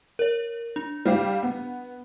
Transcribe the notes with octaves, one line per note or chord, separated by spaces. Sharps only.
A#4 C#5
D4
G3 G4 F5
B3